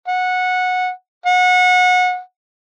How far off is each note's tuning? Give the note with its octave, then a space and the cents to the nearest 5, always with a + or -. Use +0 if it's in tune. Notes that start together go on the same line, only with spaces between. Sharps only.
F#5 -15
F#5 -25